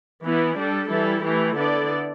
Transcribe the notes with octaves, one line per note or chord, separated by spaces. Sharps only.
E3 B3 E4
G3 D4 A4
E3 G3 E4 A4
E3 A3 E4 G4
D3 B3 E4 A4 D5